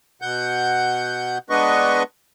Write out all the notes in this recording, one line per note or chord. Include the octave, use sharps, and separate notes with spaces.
B2 F#5 G6
G#3 B3 D4 B4 D#5 C#6